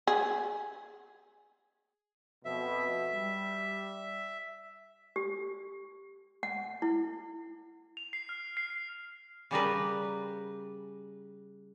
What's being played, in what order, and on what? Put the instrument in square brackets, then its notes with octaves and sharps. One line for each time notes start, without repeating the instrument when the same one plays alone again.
[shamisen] G#4
[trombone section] F2 B2 [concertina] E5
[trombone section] G3
[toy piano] G4
F#5
E4
[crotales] F7
C7
F6
C7
[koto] C#3 G3 A#4 B4